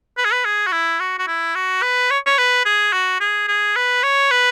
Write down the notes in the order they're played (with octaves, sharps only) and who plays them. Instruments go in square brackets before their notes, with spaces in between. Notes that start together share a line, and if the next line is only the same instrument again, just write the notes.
[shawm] B4
G#4
B4
G#4
F#4
E4
F#4
F#4
E4
F#4
B4
C#5
C#5
B4
G#4
F#4
G#4
G#4
B4
C#5
B4